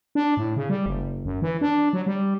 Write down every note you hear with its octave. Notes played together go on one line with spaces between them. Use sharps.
D4
A2
C#3
G3
F#1
F#2
E3
D4
F#3
G3